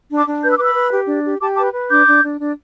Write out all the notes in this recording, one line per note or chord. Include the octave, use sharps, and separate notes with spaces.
D4
A5 D6
D4
B4 G6
E6
B4 D6
B5 E6
B4
G4
D4
G4
G4 A5 D6
B4 A5 D6
B4
D4 D6 G6
D4
D4
D4